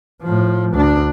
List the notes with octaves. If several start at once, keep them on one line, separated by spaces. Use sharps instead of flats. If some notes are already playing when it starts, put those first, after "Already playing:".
A2 F3
D2 D4